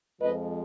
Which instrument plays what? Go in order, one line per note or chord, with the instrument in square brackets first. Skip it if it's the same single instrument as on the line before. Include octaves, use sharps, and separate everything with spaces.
[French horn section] F2 F3 G#3 B4 D#5